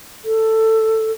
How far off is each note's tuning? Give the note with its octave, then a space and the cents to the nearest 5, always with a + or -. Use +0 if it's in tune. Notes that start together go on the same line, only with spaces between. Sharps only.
A4 +10